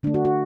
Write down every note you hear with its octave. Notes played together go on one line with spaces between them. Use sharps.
D3 A3 D4
F#4
F#4